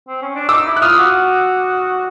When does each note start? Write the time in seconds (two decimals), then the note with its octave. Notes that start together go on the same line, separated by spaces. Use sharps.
0.08 C4
0.22 C#4
0.35 D4
0.49 D#4 D6 E6
0.66 E4
0.77 F#6
0.82 F4 D#6 F6
0.98 F#4